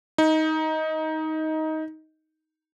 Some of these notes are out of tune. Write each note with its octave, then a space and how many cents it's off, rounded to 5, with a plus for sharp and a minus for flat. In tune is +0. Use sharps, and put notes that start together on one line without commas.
D#4 +15